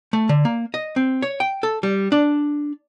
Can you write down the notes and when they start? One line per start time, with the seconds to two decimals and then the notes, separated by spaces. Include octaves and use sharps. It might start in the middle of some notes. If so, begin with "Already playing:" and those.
0.13 A3
0.29 D3
0.45 A#3
0.74 D#5
0.96 C4
1.22 C#5
1.40 G5
1.63 A4
1.83 G3
2.12 D4